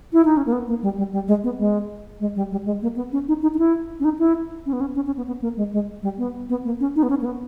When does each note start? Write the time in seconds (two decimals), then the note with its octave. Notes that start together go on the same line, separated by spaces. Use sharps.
0.13 E4
0.25 D#4
0.37 C#4
0.46 A#3
0.52 B3
0.68 A#3
0.83 G3
0.98 G3
1.12 G3
1.28 G#3
1.44 B3
1.59 G#3
2.20 G#3
2.36 G3
2.51 G3
2.66 G#3
2.82 A#3
2.96 B3
3.12 C#4
3.28 D#4
3.42 D#4
3.54 D#4
3.59 E4
4.00 C#4
4.04 D#4
4.19 E4
4.66 C#4
4.73 B3
4.81 C#4
4.96 C#4
5.06 C#4
5.17 B3
5.27 B3
5.42 A#3
5.57 G#3
5.73 G#3
6.03 G3
6.18 B3
6.49 B3
6.65 A#3
6.80 C#4
6.96 D#4
7.03 B3
7.10 C#4
7.21 A#3
7.25 B3